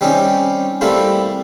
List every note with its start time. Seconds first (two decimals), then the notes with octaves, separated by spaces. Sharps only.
0.01 G3 C4 C#4 D#4 G4
0.81 G3 A3 A#3 C4 E4 F4